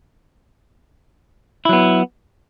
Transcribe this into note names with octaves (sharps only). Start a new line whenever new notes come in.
F#3 B3 E4